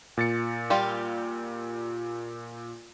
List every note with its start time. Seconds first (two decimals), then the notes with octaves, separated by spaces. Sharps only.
0.17 A#2 A6 C#7
0.70 G3 F4 G4